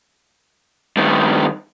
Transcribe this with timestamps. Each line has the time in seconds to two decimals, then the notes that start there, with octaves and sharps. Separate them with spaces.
0.97 G2 D#3